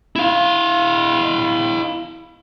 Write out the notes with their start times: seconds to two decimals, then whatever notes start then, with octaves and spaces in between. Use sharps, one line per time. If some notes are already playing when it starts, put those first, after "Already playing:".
0.16 E4 F5